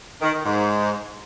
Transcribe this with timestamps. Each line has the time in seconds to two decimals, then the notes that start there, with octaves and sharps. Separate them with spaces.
0.22 D#3
0.33 D#3
0.45 G#2